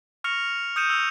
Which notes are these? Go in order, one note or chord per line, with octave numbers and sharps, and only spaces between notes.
C#6 F6 A#6 C#7 F7
D#6 G6 C#7 D#7 E7
E6 F7